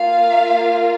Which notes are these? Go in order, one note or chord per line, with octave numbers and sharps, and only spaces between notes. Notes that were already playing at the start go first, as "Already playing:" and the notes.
Already playing: A#3 F4 F5